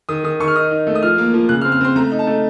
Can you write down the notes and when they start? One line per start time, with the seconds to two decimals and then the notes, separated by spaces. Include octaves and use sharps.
0.09 D#3 D#6
0.24 D#3 D#6
0.40 D#3 C#6
0.48 F6
0.56 D#4 D#6
0.71 D#4
0.87 A3
0.95 D#6
1.02 F3 F6
1.18 A#3
1.34 F3
1.49 C#3 F#6
1.61 F6
1.65 C4
1.72 F6
1.81 C4 C6
1.96 A3 A#5
2.12 D#4
2.19 A5
2.27 A3